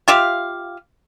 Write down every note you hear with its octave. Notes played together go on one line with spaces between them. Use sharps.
F4 G4 E5 F5